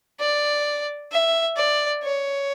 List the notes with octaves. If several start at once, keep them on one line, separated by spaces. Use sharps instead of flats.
D5
E5
D5
C#5